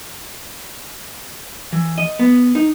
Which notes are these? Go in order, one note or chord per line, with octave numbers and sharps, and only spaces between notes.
E3
D#5
B3
D#4